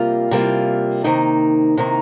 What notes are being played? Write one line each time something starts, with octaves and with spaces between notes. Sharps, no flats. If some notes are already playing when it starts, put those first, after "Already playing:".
Already playing: C3 G3 A#3 F4
C3 G3 A#3 F4
C3 D#3 A#3 D#4
C3 D#3 A#3 D#4